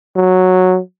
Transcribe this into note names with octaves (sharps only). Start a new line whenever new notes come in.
F#3